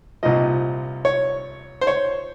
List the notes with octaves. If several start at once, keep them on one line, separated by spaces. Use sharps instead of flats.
C2 A#2 F3 D#5
C#5
C5
C#5